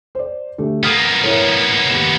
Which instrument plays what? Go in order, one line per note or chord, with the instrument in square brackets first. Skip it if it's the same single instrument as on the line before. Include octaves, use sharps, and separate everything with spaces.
[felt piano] C5 D5
D2 A3 G4
[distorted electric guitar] A#3 B3 [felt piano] D#6 F6 D7
[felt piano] E4 A#4 C#5
D#2 E7